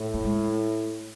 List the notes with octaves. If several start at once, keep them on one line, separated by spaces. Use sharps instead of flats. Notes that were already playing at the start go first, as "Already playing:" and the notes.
Already playing: A2
A3
G#3